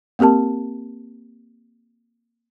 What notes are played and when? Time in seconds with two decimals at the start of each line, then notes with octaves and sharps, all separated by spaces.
0.19 A#3 C4 G4 A#4 A5